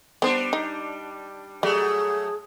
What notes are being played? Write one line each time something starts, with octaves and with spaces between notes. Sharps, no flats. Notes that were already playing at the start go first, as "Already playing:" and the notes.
G3 B3 D4 C5
D#4
F#3 G3 A3 G#4